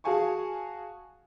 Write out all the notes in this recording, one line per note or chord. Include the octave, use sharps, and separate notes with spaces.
F#4 G#4 F5 G#5 A5 C#6